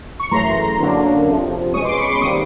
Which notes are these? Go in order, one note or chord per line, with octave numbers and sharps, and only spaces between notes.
C#6
F#2 C#3 E3 A3 A#5 C6
F#2 D3 F#3 A#3 D4
F2 C3 F3
B2 G#3 C#4 C#6 D#6
C6 D6
B5 C#6
C6 D6
C3 D#3 G3 A#3 C#6 D#6